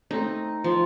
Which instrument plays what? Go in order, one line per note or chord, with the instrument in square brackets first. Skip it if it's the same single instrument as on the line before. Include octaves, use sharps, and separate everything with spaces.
[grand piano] A3 C4 [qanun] D#4
[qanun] F3